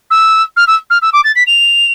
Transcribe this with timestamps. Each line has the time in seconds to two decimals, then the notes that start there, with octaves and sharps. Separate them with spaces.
0.10 E6
0.56 F6
0.67 E6
0.90 F6
1.02 E6
1.13 D6
1.24 A6
1.35 B6
1.47 F7